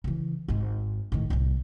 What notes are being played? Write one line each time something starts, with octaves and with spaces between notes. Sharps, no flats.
C#3 E3
G#1 G#2
A2 D#3
C2 A2